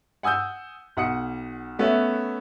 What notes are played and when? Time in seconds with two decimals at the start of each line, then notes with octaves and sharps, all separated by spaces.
0.23 F#5 G#5 D#6 E6 G6
0.97 B1 F#5 D#6 C#7
1.79 A3 B3 C#4 B4 E5